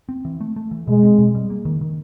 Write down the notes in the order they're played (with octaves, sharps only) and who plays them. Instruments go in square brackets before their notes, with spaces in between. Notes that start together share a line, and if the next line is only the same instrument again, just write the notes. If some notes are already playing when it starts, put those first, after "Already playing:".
[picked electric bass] C4
E3
A3
A3
E3
[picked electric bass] B2 [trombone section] G#3
[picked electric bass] C4
B2
G3
A#3
D#3
D#3